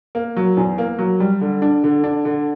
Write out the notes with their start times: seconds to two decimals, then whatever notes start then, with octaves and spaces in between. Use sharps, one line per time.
0.15 A#3
0.36 F#3
0.57 E2
0.78 A#3
0.98 F#3
1.20 G3
1.41 D3
1.62 D4
1.84 D3
2.04 D4
2.25 D3